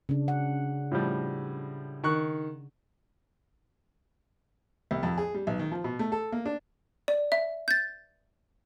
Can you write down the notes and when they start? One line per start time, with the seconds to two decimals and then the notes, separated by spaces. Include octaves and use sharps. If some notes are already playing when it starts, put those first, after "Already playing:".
0.09 C#3 D4
0.28 F#5
0.92 A2 F3 G3
2.04 D#3 C#6 F#6
4.91 C2
5.03 F2
5.18 G#4
5.34 G3
5.47 B1
5.59 D#3
5.71 F3
5.84 B2
5.99 A3
6.12 A4
6.32 A#3
6.46 D4
7.08 D5
7.32 E5
7.68 G6 A6